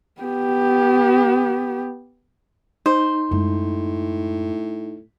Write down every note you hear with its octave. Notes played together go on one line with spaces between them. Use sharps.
B3 G4
D#4 C5
F#2 A2 G#3